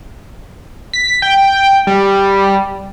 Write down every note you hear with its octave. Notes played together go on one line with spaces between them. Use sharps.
B6
G5
G3